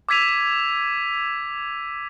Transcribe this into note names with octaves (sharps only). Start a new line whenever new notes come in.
D6 E6 G#6 B6 D#7 F7